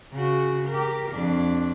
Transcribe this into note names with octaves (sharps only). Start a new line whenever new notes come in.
C#3 F#4
G4 A#4
F2 D4